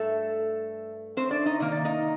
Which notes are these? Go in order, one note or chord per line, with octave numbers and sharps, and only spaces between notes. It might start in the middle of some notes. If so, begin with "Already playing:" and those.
Already playing: G2 A3 A4
C4 C5
D4 D5
D#4 D#5
C3 D#3 A#3 D#5
D5
D#4 D#5